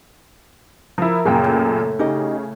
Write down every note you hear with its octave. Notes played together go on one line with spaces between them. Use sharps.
F3 E4 A#4
F#2 A#2 C#3 G#4 F5 G5
A2
C#3 D#4 G4 D#5